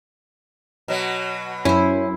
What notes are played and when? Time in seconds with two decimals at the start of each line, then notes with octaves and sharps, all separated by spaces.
0.88 B2 F#3
1.65 F#2 C#4 E4 C5